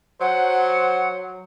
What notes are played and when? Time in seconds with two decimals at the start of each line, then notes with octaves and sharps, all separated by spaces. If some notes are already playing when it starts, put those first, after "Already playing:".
0.21 F#3 C5 F#5